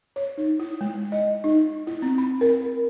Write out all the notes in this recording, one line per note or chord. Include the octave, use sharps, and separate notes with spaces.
C#5
D#4
E4
G#3
D#5
D#4
E4
C4
B5
A#4